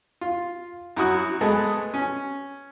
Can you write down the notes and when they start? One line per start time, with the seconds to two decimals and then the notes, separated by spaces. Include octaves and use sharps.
0.21 F4
0.97 F#2 E4 F#4 D#6 F#6
1.41 G#3 A3 B3
1.94 C#4